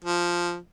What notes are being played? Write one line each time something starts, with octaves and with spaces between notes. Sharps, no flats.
F3